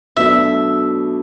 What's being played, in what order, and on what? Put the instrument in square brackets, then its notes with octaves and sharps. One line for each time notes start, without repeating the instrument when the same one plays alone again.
[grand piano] B2 F#3 A3 D4 B4 [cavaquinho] E5